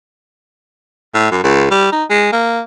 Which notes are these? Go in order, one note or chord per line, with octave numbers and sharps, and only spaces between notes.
A2
F#2
C#2
G3
D#4
G#3
A#3